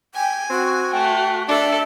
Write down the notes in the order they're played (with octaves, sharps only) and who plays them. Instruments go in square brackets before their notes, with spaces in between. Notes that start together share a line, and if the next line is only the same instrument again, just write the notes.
[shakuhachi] G5 [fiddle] G#5
[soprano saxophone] C4 [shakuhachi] F#4
[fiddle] A3 [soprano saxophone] G5
[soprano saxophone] D4 [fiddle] A4 D5 [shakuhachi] E5